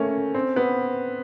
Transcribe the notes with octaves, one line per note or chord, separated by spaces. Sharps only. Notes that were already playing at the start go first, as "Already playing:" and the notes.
Already playing: A3 A#3 C#4
C4
B3